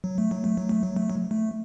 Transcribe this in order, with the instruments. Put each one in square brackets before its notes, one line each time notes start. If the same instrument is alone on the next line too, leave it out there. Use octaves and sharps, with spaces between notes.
[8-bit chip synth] F#3
A3
F#3
A3
F#3
A3
F#3
A3
F#3
A3